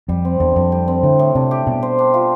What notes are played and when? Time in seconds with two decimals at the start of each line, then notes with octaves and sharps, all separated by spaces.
0.09 F2 G3
0.25 C4
0.40 E2 D3
0.56 F2 D3
0.72 G3
0.88 C4
1.03 A2 D3
1.19 A2
1.35 C3 D4
1.51 G4
1.67 B2 G3
1.82 C5
1.99 D4
2.14 F4